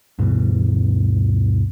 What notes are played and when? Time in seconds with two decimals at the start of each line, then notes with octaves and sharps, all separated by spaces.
0.19 D2 G2 B2 E3